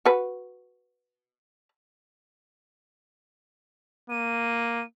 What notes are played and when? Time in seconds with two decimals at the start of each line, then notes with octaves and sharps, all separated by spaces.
0.05 F#4 B4
4.10 A#3 D#7